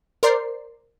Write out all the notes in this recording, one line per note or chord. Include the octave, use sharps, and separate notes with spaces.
A#4 C5 D5 C7